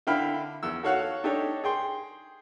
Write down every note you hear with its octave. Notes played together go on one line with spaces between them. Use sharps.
D3 E4 F5 G5 B5 F6
E2 E6
F#4 A4 C#5 F5 F#5 F#6
D4 D#4 G4 A4 C#5
G#4 G5 C6